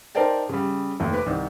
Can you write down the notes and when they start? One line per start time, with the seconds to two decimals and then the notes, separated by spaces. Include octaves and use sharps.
0.15 D#4 A#4 C5 D5 G5 A5
0.49 C#3 G3
1.00 F1 D#2
1.13 B4 D6
1.26 C2 D#3